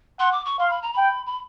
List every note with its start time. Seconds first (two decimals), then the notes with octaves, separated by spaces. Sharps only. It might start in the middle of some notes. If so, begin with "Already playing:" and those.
0.20 F#5 C6
0.32 D6
0.45 C#6
0.59 F5 C6
0.70 B5
0.82 A#5
0.93 G5 B5
1.26 B5